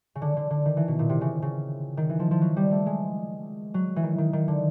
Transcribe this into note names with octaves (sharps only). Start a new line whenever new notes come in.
C#3
D3
D3
D3
D#3
E3
B2
A#2
C3
C#3
C#3
D#3
E3
F3
F3
F#3
G3
A3
G#3
F#3
E3
D#3
D#3
D#3
D3